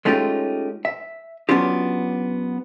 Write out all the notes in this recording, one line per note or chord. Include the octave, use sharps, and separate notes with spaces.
G#3 A3 C#4 D#4 F4 G4
E5
F#3 B3 C#4 D4 F4 G4